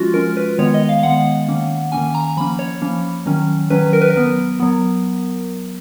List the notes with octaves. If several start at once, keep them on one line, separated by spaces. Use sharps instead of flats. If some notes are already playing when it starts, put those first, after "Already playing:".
Already playing: F3 G#3 C#4 F4 F#4
F3 G#3 C#4 A#4
B4
D#3 G#3 B3 C#5
D#5
F5
D#3 G#3 B3 F#5
D#3 A#3 C#4
D#3 A#3 C#4 G#5
A#5
F3 A#3 C#4 B5
C#5
F3 A#3 C#4
D#3 F#3 C#4
D#3 F#3 C#4 B4
A#4
B4
A#4
F#3 B3
F#3 B3